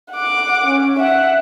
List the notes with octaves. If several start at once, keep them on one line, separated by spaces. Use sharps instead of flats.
F#5 D6
C#4
E5 F#5